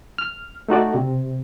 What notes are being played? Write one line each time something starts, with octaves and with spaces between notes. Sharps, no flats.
F6
A3 D#4 F#4 D5
C3